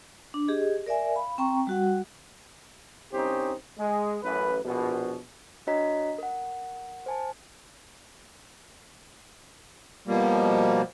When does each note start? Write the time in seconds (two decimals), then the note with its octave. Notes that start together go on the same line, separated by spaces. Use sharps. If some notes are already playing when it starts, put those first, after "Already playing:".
0.34 D4
0.48 G4 G#4 D#5
0.86 A#4 D5 E5 G#5
1.15 F5 B5
1.38 C4 G5 A#5 C#6
1.67 G3 F#4 F#5
3.12 C2 C4 C#4 D#4 G4 C5
3.77 G#3
4.23 A1 F#2 B4
4.64 A#1 B2
5.67 D4 F#4 C#5 D#5 A#5 B6
6.19 A#4 F#5
7.06 C5 G#5 A5
10.08 B2 F3 G3 A#3